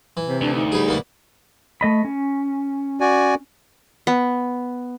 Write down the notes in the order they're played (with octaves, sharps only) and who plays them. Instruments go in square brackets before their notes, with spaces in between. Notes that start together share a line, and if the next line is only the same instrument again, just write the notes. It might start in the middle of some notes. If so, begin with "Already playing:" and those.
[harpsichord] E3
[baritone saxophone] C3 [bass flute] C5
[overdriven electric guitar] D2 [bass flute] D4
[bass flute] D#4
[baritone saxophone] G3 [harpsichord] G#4 B4
[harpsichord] A#3 B3 D4
[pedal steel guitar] A3 D#5 B5
C#4
[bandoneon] F#4 D5 G#5
[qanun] B3